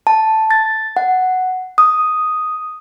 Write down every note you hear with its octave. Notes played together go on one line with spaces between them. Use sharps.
A5
A6
F#5
D#6